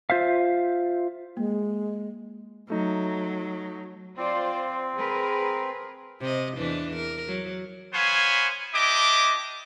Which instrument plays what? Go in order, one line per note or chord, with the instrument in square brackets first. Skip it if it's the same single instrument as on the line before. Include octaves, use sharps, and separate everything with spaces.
[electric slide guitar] F4 C5 E5 F5
[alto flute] G#3 [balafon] A#3
[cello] F#3 [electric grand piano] A3 D#4
[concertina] C4 [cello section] F4 C5 D5
[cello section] G#4 A#4 B4
[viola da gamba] C3 D#5
E2 E3 D4
A#4
F#3
[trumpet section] B3 C5 C#5 F5 G#5 B5
D4 E4 G4 D#5 D6